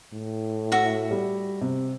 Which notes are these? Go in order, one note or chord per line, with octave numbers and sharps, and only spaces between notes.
A2
F#4 E5
G3
C3